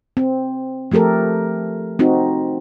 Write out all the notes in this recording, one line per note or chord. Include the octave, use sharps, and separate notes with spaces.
C4
F3 A3 G4 A4 A#4
C4 D#4 F#4